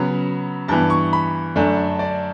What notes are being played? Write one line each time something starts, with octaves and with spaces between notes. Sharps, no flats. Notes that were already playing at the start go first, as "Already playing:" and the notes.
Already playing: C#3 F#3 B3 B5
G2 E3 B3 A5
C#6
B5
F#2 D3 A3 D4
D5